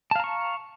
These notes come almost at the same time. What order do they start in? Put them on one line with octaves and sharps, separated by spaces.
A5 F5 A#5 C#6